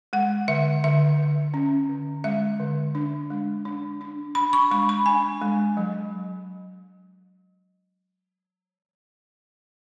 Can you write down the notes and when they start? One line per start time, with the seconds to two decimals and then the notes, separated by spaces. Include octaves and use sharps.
0.13 G#3 F#5
0.48 D3 E5
0.84 D3 E5
1.19 D3
1.54 C#4
1.89 D3
2.24 G#3 E5
2.60 D3
2.95 D4
3.30 G#3
3.65 D4
4.01 D4
4.35 D4 B5
4.53 C#6
4.71 G#3 B5
4.89 B5
5.06 D4 G#5
5.42 G#3
5.77 F#3